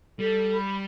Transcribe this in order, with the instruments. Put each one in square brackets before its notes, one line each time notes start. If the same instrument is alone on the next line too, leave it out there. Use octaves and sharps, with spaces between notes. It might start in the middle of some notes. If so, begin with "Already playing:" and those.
[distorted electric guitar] G3 [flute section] A4
[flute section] B5